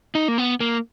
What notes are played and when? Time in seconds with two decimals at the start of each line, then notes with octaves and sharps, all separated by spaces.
0.15 D#4
0.28 A#3
0.38 B3
0.60 A#3